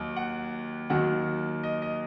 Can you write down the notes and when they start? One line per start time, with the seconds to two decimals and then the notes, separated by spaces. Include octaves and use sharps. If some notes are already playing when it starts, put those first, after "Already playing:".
Already playing: D#2 D#3 F#3
0.17 F#5
0.90 D#2 D#3 F#3 F#5
1.63 D#5
1.82 D#5